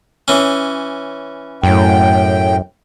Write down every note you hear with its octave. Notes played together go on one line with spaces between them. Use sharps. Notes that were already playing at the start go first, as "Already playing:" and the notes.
E3 C#4
F#2 A2 G5